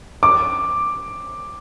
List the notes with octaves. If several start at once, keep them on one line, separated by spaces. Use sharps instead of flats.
D6